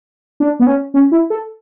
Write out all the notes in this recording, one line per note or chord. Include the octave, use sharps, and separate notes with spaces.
D4
B3
C#4
C#4
E4
A4